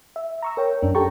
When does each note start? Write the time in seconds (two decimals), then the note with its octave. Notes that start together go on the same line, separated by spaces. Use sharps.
0.16 E5
0.42 A#5 C#6 E6
0.57 A#4 C#5 G5
0.82 F#2 C#4 D4
0.95 G4 A4 G5 A5 A#5 C#6